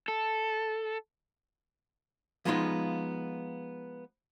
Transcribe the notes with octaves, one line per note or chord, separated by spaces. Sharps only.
A4
F3 G#3 B3 D#4 F4